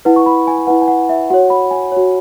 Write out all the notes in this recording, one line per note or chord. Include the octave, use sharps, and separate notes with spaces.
E4 B4 F#5
C#6
B5
G#5
G#5
E4 B4 F#5
G#5
F#5
E5
F#4 C#5 F#5
B5
G#5
C#5
F#4